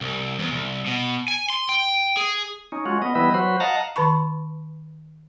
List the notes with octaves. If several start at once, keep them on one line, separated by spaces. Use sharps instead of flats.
C2
E2
C2
B2
G#5
C6
G5
G#4
C#4 D#4
G#3 C#4 F4 F#4
B3 D#5
E3 G3 B3 E4 B4 D#5
F#3 F#4 B4 C5
D#5 F5 F#5 A5 A#5
D#3 B4 A5 B5 C#6